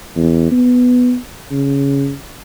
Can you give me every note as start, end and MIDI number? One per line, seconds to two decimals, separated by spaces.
0.16 0.51 40
0.51 1.15 59
1.50 2.13 49